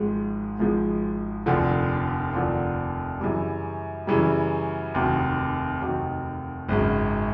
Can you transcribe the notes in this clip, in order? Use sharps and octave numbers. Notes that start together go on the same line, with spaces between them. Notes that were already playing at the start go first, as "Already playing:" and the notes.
Already playing: G#1 G#2 F3 G#3
G#1 G#2 F3 G#3
F1 D#2 D3 F3
F1 D#2 D3 F3
F#2 C#3 E3 G3
F#2 C#3 E3 G3
F1 D#2 D#3 F#3
F1 D#2 D#3 F#3
G#1 F#2 C#3